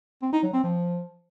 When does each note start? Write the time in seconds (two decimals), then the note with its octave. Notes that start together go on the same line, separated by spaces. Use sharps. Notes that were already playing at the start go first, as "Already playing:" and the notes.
0.22 C4
0.33 D#4
0.43 F#3
0.53 C4
0.64 F3